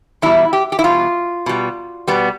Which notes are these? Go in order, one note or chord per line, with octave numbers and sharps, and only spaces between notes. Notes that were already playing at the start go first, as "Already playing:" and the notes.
E2 B2 G3 E4
G4
G4
E4
E2 B2 G3 F4
B2 G3
B2 G3 B3